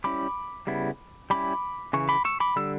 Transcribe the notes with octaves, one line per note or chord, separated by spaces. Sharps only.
G3 C#4 E4 B5 D6
C#3 G3 B3 E4
G3 C#4 E4 B5 D6
C#3 E3 C#6
B5 D6
C#6 E6
B5 D6
D3 G3 E6